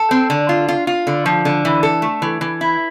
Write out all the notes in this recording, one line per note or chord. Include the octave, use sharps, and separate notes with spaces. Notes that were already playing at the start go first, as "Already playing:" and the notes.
Already playing: A4
C4
D3
F4
F4
F4
D3
F3
D3
E3
A4
A3
E3
E3
E4